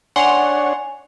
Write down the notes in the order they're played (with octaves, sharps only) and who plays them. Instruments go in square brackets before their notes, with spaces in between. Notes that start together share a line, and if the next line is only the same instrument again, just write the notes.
[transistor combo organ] D4 C#5 [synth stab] F#5 C6 [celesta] G#5 F7